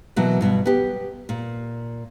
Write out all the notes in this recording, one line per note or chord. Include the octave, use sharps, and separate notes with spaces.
B2 E3 F#3 A#3
G2 B2
B3 G4
A#2